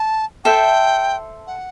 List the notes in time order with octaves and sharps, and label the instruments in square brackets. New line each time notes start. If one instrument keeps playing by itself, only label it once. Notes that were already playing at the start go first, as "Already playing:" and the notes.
Already playing: [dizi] A5
[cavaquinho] A4 C5 E5 [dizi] G5
[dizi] F#5